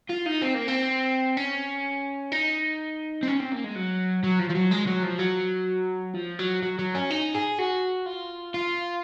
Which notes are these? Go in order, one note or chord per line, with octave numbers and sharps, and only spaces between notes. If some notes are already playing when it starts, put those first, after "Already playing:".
F4
D#4
C4
A#3
C4
C#4
D#4
C4
C#4
C4
A#3
G#3
F#3
F#3
F3
F3
F#3
G#3
F#3
F3
F#3
F3
F#3
F#3
F#3
C#4
D#4
G#4
F#4
F4
F4